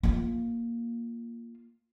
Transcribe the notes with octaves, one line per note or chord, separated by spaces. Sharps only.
A#3 F4